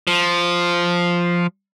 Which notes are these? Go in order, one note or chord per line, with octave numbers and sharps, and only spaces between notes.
F3